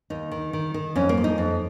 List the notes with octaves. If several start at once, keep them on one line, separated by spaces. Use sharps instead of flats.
D#2 D#4
D#3
D#3
D#3
F2 C#4
A#3
F2
D#4
F2